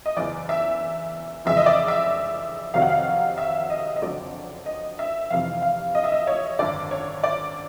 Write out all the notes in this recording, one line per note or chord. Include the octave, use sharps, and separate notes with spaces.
D#5
F#1 E2 C#3 E3 D5
E5
F1 F2 C#3 E3 G#3 E5
D#5
D5
E5
F2 C3 D#3 F#3 F5
F#5
F5
E5
D#5
D#5
F#1 F2 D3 F#3 D5
D#5
E5
F1 F2 C3 E3 F5
F5
D#5
E5
D#5
C#5
G#1 F#2 D3 D5
C#5
D5